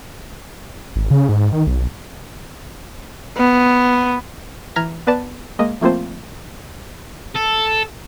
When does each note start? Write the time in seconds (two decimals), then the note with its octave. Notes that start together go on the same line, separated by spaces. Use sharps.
0.96 G#1
1.11 C#3
1.29 G#2
1.52 D#3
1.67 B1
3.37 B3
4.76 E3 A#5 F6 G#6 A#6 B6
5.07 B3 B4 D5 A5
5.59 G#3 A#3 D#5
5.81 F3 A3 A#3 C4 F4 C5
7.36 A4